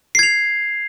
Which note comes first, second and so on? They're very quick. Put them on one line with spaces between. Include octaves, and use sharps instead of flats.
C7 G#6 F7